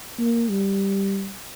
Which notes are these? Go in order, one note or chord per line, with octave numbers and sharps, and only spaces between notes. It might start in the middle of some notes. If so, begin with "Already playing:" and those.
A#3
G3